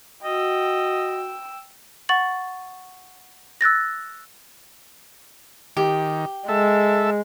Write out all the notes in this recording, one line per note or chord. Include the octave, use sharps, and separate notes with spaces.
F#4 D#5 G5 E6
F#5 C#6 A6 F#7
E6 F#6 A6 A#6
D#3 G4
G#3 A4 E5